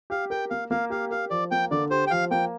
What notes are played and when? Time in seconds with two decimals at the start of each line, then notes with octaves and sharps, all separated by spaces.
0.10 G4 F5
0.30 A#4 G5
0.50 A#3 F5
0.71 A#3 F5
0.90 G4 F5
1.11 A#4 F5
1.30 F3 D5
1.51 A#3 G5
1.71 D3 D5
1.91 G4 C5
2.07 G5
2.11 F3 F5
2.31 A#3 G5